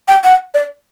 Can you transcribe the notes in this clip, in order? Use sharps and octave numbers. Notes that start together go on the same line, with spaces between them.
G5
F#5
D5